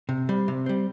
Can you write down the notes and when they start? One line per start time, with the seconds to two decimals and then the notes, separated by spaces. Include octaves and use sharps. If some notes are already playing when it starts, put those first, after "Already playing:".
0.09 C3
0.29 G3 C4
0.48 C3
0.66 G3 C4